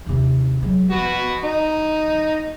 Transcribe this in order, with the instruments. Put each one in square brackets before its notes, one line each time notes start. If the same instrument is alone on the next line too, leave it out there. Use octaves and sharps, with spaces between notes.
[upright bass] D#2 C3
F#3 G#3
[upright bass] F3 [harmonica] F#4 B4
[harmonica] D#4